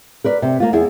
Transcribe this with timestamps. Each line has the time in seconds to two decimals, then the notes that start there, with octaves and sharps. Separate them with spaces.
0.24 A#4 B4 D5
0.42 C3
0.60 A#3 F4
0.73 E2 E4 G#4